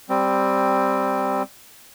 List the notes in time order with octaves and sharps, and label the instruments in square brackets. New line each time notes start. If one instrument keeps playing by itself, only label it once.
[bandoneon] G3 C4